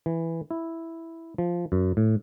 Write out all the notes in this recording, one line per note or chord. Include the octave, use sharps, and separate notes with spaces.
E3
E4
F3
F#2
A2